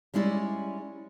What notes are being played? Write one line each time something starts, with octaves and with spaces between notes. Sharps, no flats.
G3 G#3 C#4 E4 D5